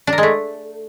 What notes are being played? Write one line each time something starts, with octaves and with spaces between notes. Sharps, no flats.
D4
A#4
G#3
A3